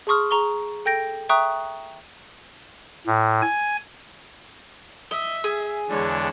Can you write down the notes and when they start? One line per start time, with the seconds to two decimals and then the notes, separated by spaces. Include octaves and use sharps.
0.07 G#4 A5 C6 C#6 D#6 F6
0.31 G#4 A#5 C#6 G7
0.85 A4 G5 G6 A#6 D7
1.29 E5 G5 A#5 C#6 D#6 F#6
3.06 A2
3.42 G#5
5.11 D#5 E5
5.44 G#4
5.89 E2 D3 G#3 D4 C#5